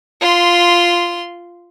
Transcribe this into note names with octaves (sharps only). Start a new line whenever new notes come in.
F4 C6